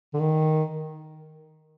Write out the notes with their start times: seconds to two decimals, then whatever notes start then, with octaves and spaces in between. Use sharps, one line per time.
0.14 D3
0.20 D#3